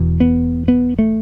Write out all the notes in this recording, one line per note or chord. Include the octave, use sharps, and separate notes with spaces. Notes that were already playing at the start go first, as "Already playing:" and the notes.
Already playing: E1 E2 B2
B3
B3
A3